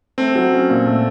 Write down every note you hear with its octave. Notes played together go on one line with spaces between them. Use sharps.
A3 C4
F#3
C#4
A#2
A3